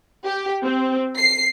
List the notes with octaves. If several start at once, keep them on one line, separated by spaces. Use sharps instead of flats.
G4
C4
C7